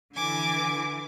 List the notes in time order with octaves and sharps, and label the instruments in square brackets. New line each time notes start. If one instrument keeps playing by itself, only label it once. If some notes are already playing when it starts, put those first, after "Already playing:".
[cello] D3 E3 [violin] G#5 D6